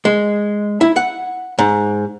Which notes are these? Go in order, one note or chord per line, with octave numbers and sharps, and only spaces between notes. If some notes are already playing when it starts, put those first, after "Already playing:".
G#3
E4
F#5
G#2